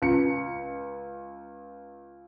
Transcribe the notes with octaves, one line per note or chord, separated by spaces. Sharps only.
C#2 C#7